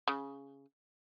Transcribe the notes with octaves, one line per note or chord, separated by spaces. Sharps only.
C#3